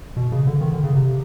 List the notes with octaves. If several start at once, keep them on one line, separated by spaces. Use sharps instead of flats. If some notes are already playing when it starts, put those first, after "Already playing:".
B2
C#3
D3
D#3
D3
C#3
C3